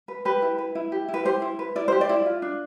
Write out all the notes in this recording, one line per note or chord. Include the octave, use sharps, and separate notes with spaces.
B4
G4 B4
E4
B4
E4
G4
E4
B4
G4 C5
E4
B4
E4 D5
G4 C5
D5
E4
F4
D4